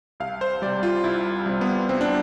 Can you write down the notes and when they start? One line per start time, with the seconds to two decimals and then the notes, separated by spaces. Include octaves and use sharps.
0.20 C2 F5
0.41 C5
0.62 C3 G3 D5
0.83 F4
1.04 C2 E4
1.46 C3 G3
1.61 B3
1.89 C2 C4
2.01 D4